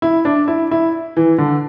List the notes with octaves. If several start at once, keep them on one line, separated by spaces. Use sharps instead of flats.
E4
D4
E4
E4
E3
D3